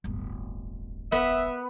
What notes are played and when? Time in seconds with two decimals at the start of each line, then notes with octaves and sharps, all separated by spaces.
0.04 D1 G1
1.12 B3 E5